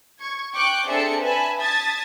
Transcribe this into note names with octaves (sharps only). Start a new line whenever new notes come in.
C#6 G#6
G5 C#6 D6 F#6 G6
C4 D4 G#4 A4 E5 C#7
B4 E5 G#5 A5 B5
A5 D#6 G#6 A6 B6